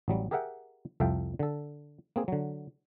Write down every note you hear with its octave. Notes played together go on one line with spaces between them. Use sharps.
A1 F#3 G3
G4 G#4 A#4 E5 F#5 G5
C2 F2 A4 E5 F5 G5
D3 A4
A#3 C4 G#4
D3 F#3